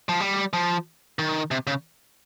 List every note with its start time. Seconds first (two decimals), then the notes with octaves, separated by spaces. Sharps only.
0.09 F3
0.20 G3
0.53 F3
1.19 D#3
1.51 C3
1.67 C#3